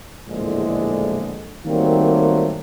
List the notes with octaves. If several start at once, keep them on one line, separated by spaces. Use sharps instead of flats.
A#1 E2 A2 D3 G#3
D#3 F#3 G3 A3 A#3 C4